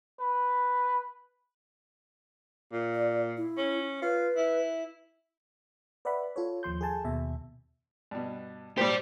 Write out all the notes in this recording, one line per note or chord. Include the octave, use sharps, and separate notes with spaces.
B4
A#2
D5
E4
C#4
F4 B4
E4
B4 D5 E5 F#5 B5
F4 A4 C#5
D#2 F3 C6 G6
G#4 A4 G#5 A5
D#2 B2 E5
G2 B2
G#1 A#2 G4 C5 D5